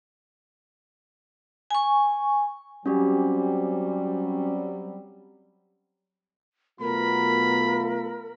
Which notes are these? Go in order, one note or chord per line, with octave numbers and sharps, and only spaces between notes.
G#5 C#6
F#3 G3 C4 C#4 F#4 G4
B2 F#3 A3 B3 F4 A#4 B5